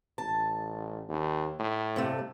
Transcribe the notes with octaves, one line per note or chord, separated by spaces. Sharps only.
A1 A5
D#2
A2
G2 C3 A3